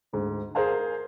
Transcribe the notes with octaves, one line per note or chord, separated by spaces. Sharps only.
D2 G#2
G#4 A#4 C5 F5 G#5